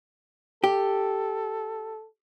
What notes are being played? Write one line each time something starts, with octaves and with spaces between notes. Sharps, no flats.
G4 A4